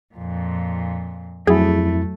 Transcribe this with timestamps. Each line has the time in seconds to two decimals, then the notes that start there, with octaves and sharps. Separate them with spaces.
0.15 F2 A#2
1.47 F2 F#3 A3 E4 G#4